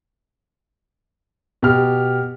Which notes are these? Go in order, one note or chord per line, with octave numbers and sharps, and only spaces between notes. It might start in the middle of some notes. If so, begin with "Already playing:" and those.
B2 G4 F6